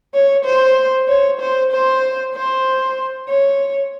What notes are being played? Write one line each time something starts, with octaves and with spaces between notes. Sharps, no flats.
C#5
C5
C#5
C5
C5
C5
C#5